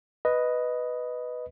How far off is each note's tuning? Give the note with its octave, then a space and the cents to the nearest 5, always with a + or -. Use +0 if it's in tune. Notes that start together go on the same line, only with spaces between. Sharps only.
B4 +0 D#5 +0